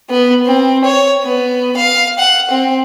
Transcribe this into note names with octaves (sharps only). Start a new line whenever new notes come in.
B3
C4
C#5
B3
F5
F#5
C4